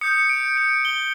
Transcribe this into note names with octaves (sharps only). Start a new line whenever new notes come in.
D#6 G6 C#7
D7
D7
G7